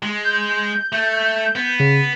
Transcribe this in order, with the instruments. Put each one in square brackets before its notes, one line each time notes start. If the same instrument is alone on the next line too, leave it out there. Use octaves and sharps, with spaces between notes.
[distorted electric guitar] G#3
[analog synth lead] G6
[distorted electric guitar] A3
B3
[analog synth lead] C#3